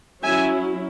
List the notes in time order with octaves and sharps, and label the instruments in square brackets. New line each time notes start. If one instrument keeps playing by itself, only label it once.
[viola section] F#3 C#4 E4 E5 G#5